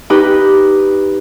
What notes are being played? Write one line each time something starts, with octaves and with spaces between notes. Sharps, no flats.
D#4 G4 B4